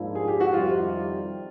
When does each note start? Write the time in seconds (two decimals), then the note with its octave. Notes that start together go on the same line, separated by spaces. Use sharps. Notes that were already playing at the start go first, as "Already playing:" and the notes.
Already playing: G#2 F3 A#3 D4 E4 F4
0.15 G#4
0.28 G4
0.40 F#4
0.53 F2 C3 D#3 G3 F4